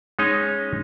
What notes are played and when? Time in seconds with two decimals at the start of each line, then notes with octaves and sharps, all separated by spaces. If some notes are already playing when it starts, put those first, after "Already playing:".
0.19 G#3 C#4 D#4 C#5 D#5